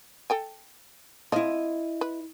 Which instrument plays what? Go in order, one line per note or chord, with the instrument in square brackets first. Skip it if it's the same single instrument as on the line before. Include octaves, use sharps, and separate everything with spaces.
[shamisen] A4 G5 G#5
[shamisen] F3 C4 F5 [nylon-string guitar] E4 D#5
[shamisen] B4